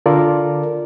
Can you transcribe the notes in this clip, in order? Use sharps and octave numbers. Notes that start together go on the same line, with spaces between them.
D3 F4 A4 A#4 D5